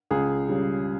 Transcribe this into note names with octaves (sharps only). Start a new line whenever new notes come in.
C#2 G#4
C#3 G3